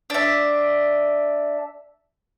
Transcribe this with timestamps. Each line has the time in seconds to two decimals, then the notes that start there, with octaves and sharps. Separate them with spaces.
0.10 D4 E5